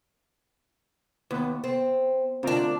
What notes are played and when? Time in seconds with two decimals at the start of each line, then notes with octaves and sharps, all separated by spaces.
1.31 D#2 B3
1.64 C4
2.43 D2 C4 D4 F4 A#4